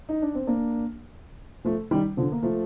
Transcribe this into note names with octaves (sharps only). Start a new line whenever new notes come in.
D#4
D4
C4
A#3 D4
F3 A3
D#3 G3
D3 F3
A#3
F3 A3